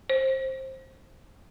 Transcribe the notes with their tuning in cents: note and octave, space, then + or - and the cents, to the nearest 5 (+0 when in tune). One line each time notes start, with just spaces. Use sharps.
C5 +20